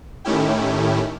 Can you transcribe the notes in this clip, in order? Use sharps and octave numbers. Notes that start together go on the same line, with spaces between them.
A2 D#3 A3 C#4 E4 G4